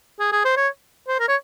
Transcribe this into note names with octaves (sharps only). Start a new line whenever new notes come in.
G#4
G#4
C5
C#5
C5
A#4
C#5